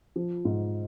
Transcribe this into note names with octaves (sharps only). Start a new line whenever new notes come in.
F3
G#2